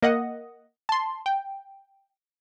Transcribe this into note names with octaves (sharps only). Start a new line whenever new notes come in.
A#3 D#5 F#5
A5 C6
G5